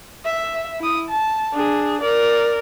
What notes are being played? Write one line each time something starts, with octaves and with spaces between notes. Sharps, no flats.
E5
E4 D#6
A5
D4 G#4
A#4 D5